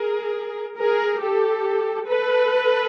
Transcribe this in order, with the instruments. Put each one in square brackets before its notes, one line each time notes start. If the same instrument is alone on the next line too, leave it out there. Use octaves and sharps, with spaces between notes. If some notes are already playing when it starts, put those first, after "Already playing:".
Already playing: [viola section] G#4 A#4
G#4 A#4
G4 A4
A4 B4